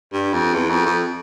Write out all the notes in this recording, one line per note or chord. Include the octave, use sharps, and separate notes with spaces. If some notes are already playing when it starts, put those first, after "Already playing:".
G2
F2
E2
F2
F2